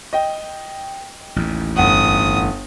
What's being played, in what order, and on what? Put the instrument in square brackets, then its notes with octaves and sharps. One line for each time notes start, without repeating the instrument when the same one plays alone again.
[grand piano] D#5 G5
[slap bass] A1 D#2
[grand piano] G1 F#5 [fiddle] D#6